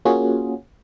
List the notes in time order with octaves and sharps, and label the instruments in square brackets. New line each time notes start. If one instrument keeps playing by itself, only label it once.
[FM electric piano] A#3 C#4 F4 F#4 G#4